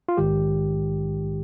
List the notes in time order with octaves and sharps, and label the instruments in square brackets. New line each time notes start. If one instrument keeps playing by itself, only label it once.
[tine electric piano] F4
A#1 G#2 D#3 G#3 G4